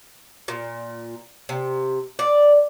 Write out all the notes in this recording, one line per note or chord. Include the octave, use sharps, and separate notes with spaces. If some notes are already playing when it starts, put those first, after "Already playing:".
A#2
C3
D5